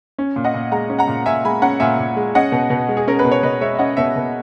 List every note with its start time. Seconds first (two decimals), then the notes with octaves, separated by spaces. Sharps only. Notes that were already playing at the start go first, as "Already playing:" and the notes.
0.18 C#4
0.36 A#2
0.44 D#5 F#5
0.54 A#2
0.72 G#3 F#5 A#5
0.90 C#4
0.99 F#5 A#5
1.08 A#2
1.26 A#2 E5 G#5
1.45 G#3 G#5 B5
1.62 C#4 F#5 A#5
1.80 A#2 E5 G#5
1.99 A#2
2.17 G#3
2.35 C#4 D#5 F#5
2.52 B2
2.70 B2
2.89 G#3
2.97 G#4
3.07 C#4 A#4
3.19 B4
3.25 B2
3.31 C#5
3.43 B2 B4 D#5
3.61 G#3 C#5 E5
3.75 E5
3.79 C#4 D#5 F#5
3.97 B2 C#5 E5
4.16 B2